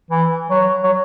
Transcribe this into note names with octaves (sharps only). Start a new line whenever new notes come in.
E3
F#3
F#3